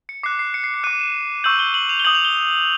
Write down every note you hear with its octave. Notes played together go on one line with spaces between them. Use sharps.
C#7
D6 F#6 C7
C7
C#7
C7
C#7
D6 F#6 D#7
E7
C#6 E6 G6 F#7
G7
F#7
F7
G7
D#6 G6 F#7
F7
G7